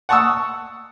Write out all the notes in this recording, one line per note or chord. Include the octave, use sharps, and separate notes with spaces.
F#5 A5 C#6 D#6 E6